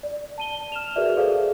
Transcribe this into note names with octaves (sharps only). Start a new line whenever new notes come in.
D5
A5 D#7 G7
F6 E7 F7
F#4 G#4 A#4 B4 D5 E5
F#4 G#4 A4 C5 D5 F5